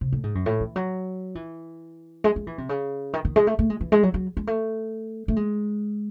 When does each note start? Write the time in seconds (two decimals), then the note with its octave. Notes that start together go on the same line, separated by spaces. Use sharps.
0.01 C3
0.12 A2
0.23 G#2
0.35 F#2
0.46 A2
0.60 E3
0.76 F#3
1.35 E3
2.24 G#3
2.36 G#3
2.47 E3
2.58 C3
2.69 C#3
3.13 D#3
3.25 D#3
3.36 G#3
3.47 A3
3.59 A3
3.70 G#3
3.81 E3
3.92 G#3
4.03 F#3
4.14 F#3
4.37 G#3
4.47 A3
5.28 A3
5.36 G#3